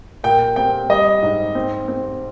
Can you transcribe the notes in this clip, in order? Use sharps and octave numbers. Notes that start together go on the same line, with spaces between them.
A#2 G5
C4 G5
G3 D#5
G#2
C4
C4